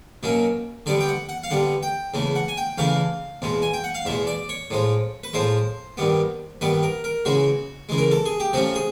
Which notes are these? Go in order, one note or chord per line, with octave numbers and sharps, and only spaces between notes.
B2 F#3 A#3 C#4
D3 G3 B3 D5
G5
F#5
F#5
F5
D3 G3 B3 F#5
G5
E2 C#3 E3 A3
F#5
G#5
G5
E2 C#3 E3 A3 F5
E2 B2 G#3
G#5
G5
F#5
F5
E2 B2 G#3 E5
D5
C#5
A2 F3 G#3
B4
A2 F3 G#3 C5
G2 D#3 G3 B3
G2 D#3 G3 B3 B4
A#4
A#4
C#3 E3 G#3 F#4
C#3 E3 G#3
A#4
A4
G#4
G4
C3 F3 A3 C#4 F#4
G#4